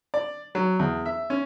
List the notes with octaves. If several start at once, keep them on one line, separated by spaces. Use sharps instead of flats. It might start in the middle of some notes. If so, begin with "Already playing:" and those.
D5
F#3
E2
E5
C#4